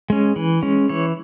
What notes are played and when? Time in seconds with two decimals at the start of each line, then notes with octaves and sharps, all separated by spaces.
0.10 G#3 C#4
0.36 E3
0.63 G#3 C#4
0.89 E3 C#5